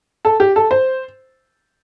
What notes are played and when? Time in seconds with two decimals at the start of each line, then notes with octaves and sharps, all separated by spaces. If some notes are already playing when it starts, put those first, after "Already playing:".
0.25 A4
0.40 G4
0.56 A4
0.71 C5